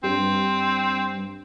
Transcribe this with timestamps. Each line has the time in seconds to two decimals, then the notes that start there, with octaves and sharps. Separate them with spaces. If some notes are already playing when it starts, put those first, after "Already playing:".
0.03 G2 C4